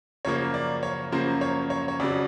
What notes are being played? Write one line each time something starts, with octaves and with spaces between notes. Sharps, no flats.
F#2 C#3 F3 A#3 C#5
D5
C#5
F#2 C#3 F3 A#3 C5
C#5
C#5
C#5
F2 C#3 F#3 D5